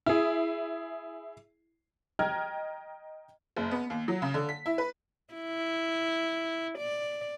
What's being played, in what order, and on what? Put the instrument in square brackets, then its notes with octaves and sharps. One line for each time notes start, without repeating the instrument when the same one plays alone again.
[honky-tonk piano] E4 G#4
D#5 G5 A#5 F6 G#6
F#1
B3
D#2
F#3
C#3
D3
B6
E4
B4
[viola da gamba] E4
D5